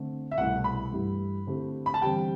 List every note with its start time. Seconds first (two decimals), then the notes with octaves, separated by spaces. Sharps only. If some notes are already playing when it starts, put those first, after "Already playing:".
Already playing: D3 A3 C4
0.31 E5
0.37 C2 B2 A3 E4 F#5
0.64 B5
0.92 G2 E3 A3 E4 G4
1.47 D3 A3 C4 E4 G4
1.86 B5
1.94 A5
2.02 E2 D3 G3 C4 G4 G5